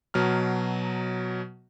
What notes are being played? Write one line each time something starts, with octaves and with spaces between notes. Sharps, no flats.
B2 F#3 A#5 F6